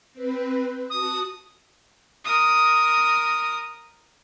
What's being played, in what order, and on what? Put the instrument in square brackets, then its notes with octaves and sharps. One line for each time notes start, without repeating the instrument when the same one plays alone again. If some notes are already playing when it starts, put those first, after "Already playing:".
[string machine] C4 B4
[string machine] F#4 A5 [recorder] D#6
[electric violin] A#4 D#6